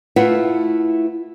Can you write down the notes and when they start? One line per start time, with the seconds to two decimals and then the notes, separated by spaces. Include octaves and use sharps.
0.16 A3 E4 F4 B4 F#5